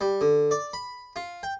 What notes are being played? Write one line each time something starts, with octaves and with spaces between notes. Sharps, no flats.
G3
D3
D5
B5
F4
G5